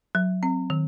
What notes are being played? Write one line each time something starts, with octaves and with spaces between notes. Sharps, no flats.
F#3
C4
D#3